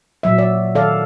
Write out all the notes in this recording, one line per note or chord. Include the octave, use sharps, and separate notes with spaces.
A#2 F#3 E5
D5
D#3 A4 D5 F5